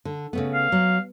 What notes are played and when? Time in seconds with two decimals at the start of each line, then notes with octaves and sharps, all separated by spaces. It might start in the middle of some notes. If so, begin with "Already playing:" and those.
0.05 D3
0.33 C#3 A3 B3
0.54 F5
0.72 F#3